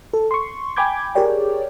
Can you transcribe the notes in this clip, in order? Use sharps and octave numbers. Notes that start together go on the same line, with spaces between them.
A4
C6 C#6
G5 G#5 B5 D6 G6 G#6
G4 G#4 A#4 C#5 D5 G5